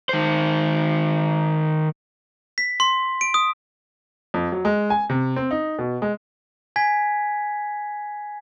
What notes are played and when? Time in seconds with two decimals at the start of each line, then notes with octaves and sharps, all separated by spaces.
0.09 D#3 C5
2.58 B6
2.80 C6
3.21 D7
3.34 D#6
4.34 F2
4.52 F#3
4.65 G#3
4.90 G#5
5.10 C3
5.36 C4
5.51 D#4
5.79 B2
6.02 G#3
6.76 G#5 G#6 B6